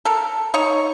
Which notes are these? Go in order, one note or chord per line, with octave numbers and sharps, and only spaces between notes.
A4 A#4
D#4 C#5 C#6